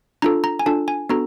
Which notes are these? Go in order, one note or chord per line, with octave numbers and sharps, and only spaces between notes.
D4 F4 A4 A#5
A#5
G#5
D4 F4 A4 A5
G#5
B3 D4 F#4 A4 A#5